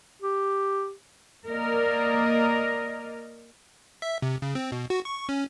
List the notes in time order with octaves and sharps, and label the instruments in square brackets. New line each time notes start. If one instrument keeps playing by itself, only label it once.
[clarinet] G4
[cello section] A#3 A#4 D5 D#5
[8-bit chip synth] E5
C3
C#3
C4
B2
F#4
C#6
C#4